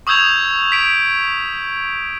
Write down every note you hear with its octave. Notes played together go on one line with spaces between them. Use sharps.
C#6 D#6 E6 G6 G#6 F7
B6 D7